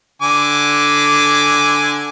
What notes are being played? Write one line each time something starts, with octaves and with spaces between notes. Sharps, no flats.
D3 G#5 D6